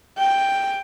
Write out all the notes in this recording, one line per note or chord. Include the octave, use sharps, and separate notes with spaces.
G5